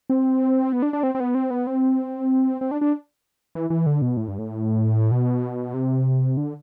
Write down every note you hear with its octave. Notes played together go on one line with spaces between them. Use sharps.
C4
B3
D4
D4
C4
C4
B3
C4
B3
C4
C4
D4
D4
E3
E3
D3
B2
A2
G2
A2
B2
C3
D3